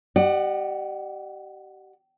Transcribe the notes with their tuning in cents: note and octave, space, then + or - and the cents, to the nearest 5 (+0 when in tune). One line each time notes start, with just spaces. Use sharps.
G4 -30 D5 +40 F#5 +0